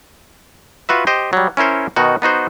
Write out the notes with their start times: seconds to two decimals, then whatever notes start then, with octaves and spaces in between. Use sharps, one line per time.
0.89 F4 F#4 B4 E5
1.07 G4 C5 D#5
1.33 F#3 G3
1.57 C#4 E4 A#4 C5 C#5
1.96 B2 D#3 D#4 F#4
2.22 B3 D#4 F#4 C5